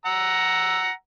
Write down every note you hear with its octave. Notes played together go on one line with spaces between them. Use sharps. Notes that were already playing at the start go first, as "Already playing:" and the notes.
F#5 A#5 E6